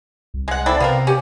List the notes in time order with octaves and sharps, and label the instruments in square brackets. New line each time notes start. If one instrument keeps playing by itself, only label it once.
[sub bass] C2
[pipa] G#3 F#5
[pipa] C4 E4 A4 [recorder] D5
[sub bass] C3 [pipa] B3 C4 A#4 [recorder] F5
[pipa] C#4 [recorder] G4